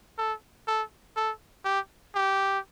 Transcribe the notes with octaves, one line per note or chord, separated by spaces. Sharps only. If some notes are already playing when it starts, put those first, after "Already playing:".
A4
A4
A4
G4
G4